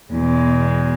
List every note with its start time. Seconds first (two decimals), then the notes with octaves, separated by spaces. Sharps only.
0.11 E2 B2 G#3